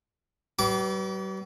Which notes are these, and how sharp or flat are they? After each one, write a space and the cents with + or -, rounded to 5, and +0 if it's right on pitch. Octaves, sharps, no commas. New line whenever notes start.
G3 -45 B4 +0 D6 -25